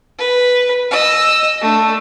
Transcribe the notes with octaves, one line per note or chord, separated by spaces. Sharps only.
B4
D#5 E6
A3 D4